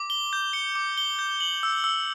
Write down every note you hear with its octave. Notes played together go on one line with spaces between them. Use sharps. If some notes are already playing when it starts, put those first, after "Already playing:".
Already playing: D6
G7
G6
C#7
D6
G7
G6
F#7
E6
E6